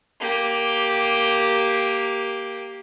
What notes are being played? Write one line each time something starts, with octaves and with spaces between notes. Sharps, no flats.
A#3 G4